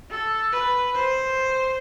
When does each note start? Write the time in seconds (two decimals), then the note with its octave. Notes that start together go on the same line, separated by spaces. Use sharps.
0.10 A4
0.52 B4
0.94 C5